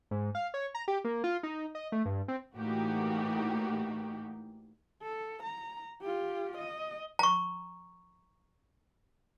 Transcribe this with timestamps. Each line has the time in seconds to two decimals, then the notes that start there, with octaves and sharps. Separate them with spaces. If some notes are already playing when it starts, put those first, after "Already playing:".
0.11 G#2
0.35 F5
0.54 C#5
0.75 A#5
0.88 G4
1.04 A#3
1.24 F4
1.43 D#4
1.75 D#5
1.92 A3
2.05 G2
2.28 C4
2.56 A2 E3 A#3 D#4 F#4 G4
5.02 A4
5.43 A#5
6.02 F4 G4
6.58 D#5
7.19 A#5 C#6